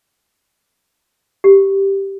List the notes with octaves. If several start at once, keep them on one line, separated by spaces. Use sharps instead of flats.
G4